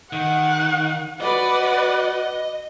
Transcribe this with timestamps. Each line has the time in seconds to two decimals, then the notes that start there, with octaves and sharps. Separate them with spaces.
0.13 D#3 F#5
1.21 F#4 B4 D5 D#5 F#5